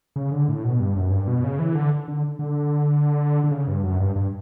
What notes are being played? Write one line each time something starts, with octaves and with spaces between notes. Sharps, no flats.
C#3
D3
A2
B2
G2
F#2
G2
B2
C#3
E3
D3
D3
D3
D3
C#3
G2
F#2
G2
G2